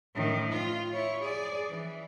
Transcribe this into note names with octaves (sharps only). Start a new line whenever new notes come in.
A2 D#3
F4
E4 C#5
G#4 D5
E3